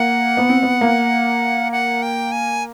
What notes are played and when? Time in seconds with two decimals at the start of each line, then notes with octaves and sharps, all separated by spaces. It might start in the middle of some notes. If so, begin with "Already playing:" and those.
Already playing: A#3 F#5
0.37 B3
0.49 C4
0.63 B3
0.81 A#3
1.72 F#5
2.02 G5
2.32 G#5